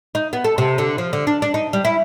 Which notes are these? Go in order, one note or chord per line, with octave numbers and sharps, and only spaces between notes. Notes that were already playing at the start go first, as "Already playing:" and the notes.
D#4
B3
A4
C3
D3
F3
D3
D4
D4
D#4
G3
E4